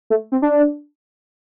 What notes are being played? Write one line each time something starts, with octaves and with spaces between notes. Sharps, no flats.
A3
C4
D4